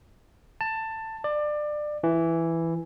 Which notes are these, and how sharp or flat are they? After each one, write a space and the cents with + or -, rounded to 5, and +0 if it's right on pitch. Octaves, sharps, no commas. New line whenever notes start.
A5 +15
D5 +25
E3 +5